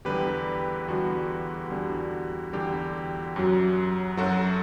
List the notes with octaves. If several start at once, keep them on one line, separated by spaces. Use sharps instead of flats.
E2 D3 G3 G4 B4
E2 D3 G3 F#4
E2 D3 G3
E2 D3 G3 G4
F#2 F#3
F#2 F#3 F#4 A4